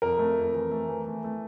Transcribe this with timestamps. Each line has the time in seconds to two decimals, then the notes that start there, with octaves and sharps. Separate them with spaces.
0.02 F2 A#4
0.19 A3
0.37 F2
0.54 E3
0.71 A3
0.89 E3
1.07 A3
1.24 A3